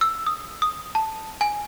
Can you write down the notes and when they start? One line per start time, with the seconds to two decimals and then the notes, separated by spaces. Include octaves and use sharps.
0.01 E6
0.27 D#6
0.62 D#6
0.95 A5
1.41 G#5